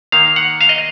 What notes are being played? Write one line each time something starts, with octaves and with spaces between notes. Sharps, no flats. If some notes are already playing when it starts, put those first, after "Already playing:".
D#3 A#3 F5
F#5
F5
D#5